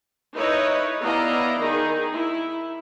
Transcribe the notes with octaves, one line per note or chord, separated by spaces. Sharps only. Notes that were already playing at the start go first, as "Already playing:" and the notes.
D#4 E4 B4 C#5 D#5
B3 E4 D5 D#5 F5 A#5
D#3 D#4 G#4
E4